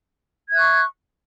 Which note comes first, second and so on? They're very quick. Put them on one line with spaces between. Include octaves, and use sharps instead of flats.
G#6 E5 F#6 C#6